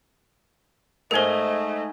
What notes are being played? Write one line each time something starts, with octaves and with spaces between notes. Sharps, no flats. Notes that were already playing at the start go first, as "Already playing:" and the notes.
G#2 A3 A#4 C5 D#5 G#5